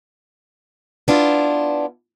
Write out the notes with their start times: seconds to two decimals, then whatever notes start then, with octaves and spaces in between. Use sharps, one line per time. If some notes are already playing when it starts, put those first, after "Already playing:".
1.08 B3 D4 E4 F4